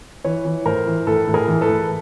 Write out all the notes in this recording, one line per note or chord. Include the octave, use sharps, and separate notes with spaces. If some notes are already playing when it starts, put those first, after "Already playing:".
E3 B4 C#5
E3
A2 A#4 C5
E3
A2 A4 B4
A2
G#4 A#4
E3
A4 B4
A2